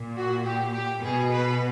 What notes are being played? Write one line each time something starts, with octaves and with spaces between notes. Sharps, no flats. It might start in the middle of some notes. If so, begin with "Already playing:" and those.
Already playing: A#2
F#4
G4
G4
B2 G#4
B4